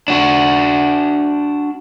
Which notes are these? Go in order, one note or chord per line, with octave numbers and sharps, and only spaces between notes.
D4 F#4